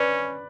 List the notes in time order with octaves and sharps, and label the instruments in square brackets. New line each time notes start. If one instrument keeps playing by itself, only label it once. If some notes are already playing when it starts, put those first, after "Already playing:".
Already playing: [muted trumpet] C#4 [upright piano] B4 D5